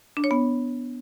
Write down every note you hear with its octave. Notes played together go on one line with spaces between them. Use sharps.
D4
C#5
B3